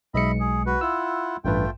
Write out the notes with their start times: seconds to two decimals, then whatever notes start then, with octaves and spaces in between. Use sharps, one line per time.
0.14 B1 G#3 D#5 E5 B5 C#7
0.40 G#4
0.66 F#4 B4
0.81 E4 F4 F#5 E6
1.45 A1 G2 A3 F4 B4 G5